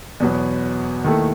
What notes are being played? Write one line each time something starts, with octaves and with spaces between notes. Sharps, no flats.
E2 B2 F#3 B3
D#2 D#3 A3 E4 A4